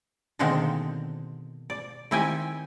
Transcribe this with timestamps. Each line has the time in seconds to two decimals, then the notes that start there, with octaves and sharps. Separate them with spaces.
0.39 B2 D3 D#3 G#3 A#3 C4
1.70 D5
2.11 D#3 C4 E4 G4 G5 G#5